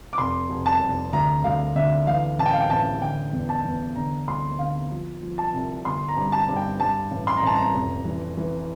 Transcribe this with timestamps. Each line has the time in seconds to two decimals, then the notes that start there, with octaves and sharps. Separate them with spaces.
0.13 D6
0.18 F1 C6
0.50 F1
0.66 A5
0.81 F1
1.13 D2 A#5
1.44 D2 F5
1.75 D3 E5
2.07 E3 F5
2.38 A1 A5
2.46 G5
2.53 F5
2.61 G5
2.70 A1 A5
3.02 D3 G5
3.33 E2
3.49 A5
3.65 E2
3.96 D3 A#5
4.28 D2 C6
4.59 D3 F5
4.91 F3
5.23 F3
5.38 A5
5.54 C2
5.85 G1 C6
6.08 A#5
6.17 G2
6.32 A5
6.49 G2
6.56 G5
6.79 G2 A5
7.11 A1
7.27 C6
7.37 A#5
7.42 A1 A5
7.56 A#5
7.74 F1
8.05 E3
8.37 E3